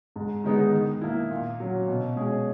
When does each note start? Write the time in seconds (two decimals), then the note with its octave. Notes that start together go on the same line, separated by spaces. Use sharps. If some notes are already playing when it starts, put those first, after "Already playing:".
0.16 G#2
0.44 D#3 G#3 B3 D#4
0.73 D#3
1.01 A#3 E4
1.31 A#2
1.60 F#3 C#4
1.88 B2
2.16 G#3 C#4 G#4